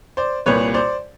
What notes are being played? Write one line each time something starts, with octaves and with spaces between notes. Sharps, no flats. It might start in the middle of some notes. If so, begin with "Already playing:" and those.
C5 D5
C2 A#2 G3 B4 C#5
C5 D5